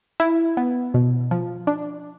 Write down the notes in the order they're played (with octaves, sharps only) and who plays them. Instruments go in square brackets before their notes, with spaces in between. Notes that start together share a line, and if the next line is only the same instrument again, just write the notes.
[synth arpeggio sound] E4
B3
B2
F3
D4